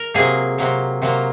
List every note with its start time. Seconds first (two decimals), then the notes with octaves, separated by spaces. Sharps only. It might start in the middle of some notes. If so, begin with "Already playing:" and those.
Already playing: A#4
0.14 C3 F#3 A#3 G#4
0.58 C3 F#3 A#3
1.02 C3 F#3 A#3